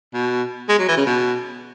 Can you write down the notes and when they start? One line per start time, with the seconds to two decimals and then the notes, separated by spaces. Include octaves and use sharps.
0.14 B2
0.69 G#3
0.79 F#3
0.89 E3
0.97 C#3
1.06 B2